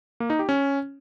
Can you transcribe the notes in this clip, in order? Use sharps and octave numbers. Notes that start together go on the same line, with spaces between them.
A#3
D#4
G4
C#4